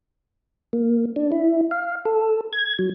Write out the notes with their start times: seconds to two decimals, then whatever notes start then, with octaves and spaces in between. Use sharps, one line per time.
0.73 A#3
1.16 D4
1.32 E4
1.71 F5
2.05 A4
2.53 G#6
2.79 F#3